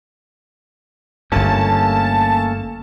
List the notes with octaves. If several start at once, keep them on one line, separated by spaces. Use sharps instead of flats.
G1 G2 A3 A#3 C#4 A5